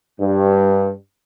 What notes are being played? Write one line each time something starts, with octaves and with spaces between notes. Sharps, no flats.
G2